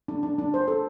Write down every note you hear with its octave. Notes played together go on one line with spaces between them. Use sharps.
D4
D4
D4
C5
A4